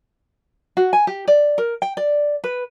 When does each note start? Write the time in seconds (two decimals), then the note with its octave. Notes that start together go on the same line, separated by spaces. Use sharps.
0.77 F#4
0.93 G#5
1.07 G4
1.28 D5
1.58 A#4
1.82 G5
1.97 D5
2.44 B4